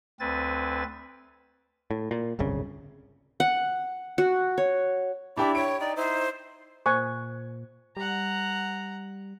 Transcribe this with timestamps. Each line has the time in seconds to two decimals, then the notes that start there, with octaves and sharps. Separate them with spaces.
0.20 D2 C4 B4 G#5 A6
1.91 A2
2.11 A#2
2.39 D1 G1 C2 C#3
3.40 F#5
4.18 F#4
4.58 C#5
5.37 D4 E4 G4 D5 G5 D6
5.55 C#5 G5 D7
5.80 D#4 D5
5.96 D#4 E4 C5
6.86 A#2 C5 G#5 C#6
7.97 G3 F#5 A#5